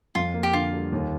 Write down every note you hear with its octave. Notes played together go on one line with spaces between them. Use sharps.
F2 F4
A#3
G4
D3 F4
G3
D#2